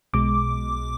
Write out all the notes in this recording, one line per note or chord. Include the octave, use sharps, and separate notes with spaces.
B1 B2 G#3 D6